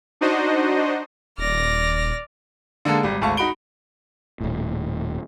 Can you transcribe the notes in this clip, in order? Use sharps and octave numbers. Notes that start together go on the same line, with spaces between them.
D4 D#4 F#4 C5 D#5
D#1 D5 F6 A#6
D3 G#3 A#3 A4
G#1 G3
G#1 D2 F5 A5 C#6
D#4 F#4 B5 D7 G7
D#1 A2